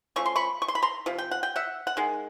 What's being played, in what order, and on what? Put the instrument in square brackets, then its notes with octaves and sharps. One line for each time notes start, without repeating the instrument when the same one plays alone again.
[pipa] F3 A3 C#4 C#6
C6
B5 C#6
C#6
C6
B5
A#5 C6
C3 F3
G5
F#5
G5
E5 F#5
F#5
D#3 G#3